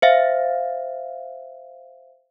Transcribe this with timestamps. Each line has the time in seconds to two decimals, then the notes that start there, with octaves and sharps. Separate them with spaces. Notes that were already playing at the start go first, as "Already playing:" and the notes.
0.02 C5 E5 F5